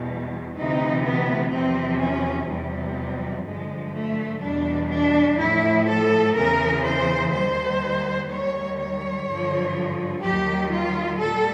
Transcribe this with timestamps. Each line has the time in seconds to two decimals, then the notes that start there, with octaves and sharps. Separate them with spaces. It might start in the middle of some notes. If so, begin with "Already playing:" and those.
Already playing: E2 B2 G3
0.55 D2 C3 E3 D#4
1.03 B3
1.51 E2 C3 F3 C4
1.99 C#4
2.48 E2 C3 F3 G3
3.45 G2 D3 F3 G#3
3.94 A3
4.42 E2 B2 G3 D4
4.90 D4
5.39 A2 F3 E4
5.88 A4
6.36 E2 C#3 E3 A#4
6.84 C5
7.32 D#2 D#3 G3 C5
8.29 D#2 D#3 G3 C#5
8.78 C#5
9.26 G2 D3 F3
10.23 D#2 D#3 F#3 G4
10.71 F4
11.20 A#2 G3 A4